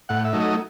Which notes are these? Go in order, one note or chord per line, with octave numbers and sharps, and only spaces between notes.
A2 F#5
E5
F#3 A3 D#4
D#5